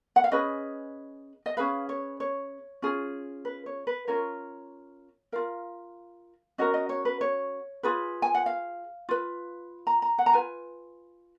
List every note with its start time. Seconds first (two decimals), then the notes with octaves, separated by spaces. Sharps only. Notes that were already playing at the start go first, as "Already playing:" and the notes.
0.16 F#5
0.24 F5
0.32 C#4 G#4 B4 D#5
1.46 D#5
1.57 C#4 G#4 B4 F5
1.89 C#5
2.20 C#5
2.82 C#4 F4 G#4
3.45 B4
3.66 C#5
3.87 B4
4.07 C#4 F4 A#4 C#5
5.32 F4 A#4 F5
6.58 C#4 F#4 A#4 D#5
6.74 D#5
6.89 C#5
7.05 B4
7.21 C#5
7.83 F4 G#4 B4
8.22 G#5
8.35 F#5
8.46 F5
9.09 F4 B4
9.87 A#5
10.02 A#5
10.18 F#5
10.26 A#5
10.33 F4 B4 G#5